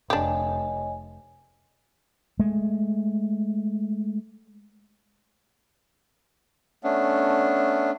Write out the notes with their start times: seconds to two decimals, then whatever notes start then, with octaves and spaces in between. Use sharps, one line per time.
0.10 F1 D4 G4 C#5 D#5 G#5
2.40 G#3 A3
6.84 A3 B3 C#4 D4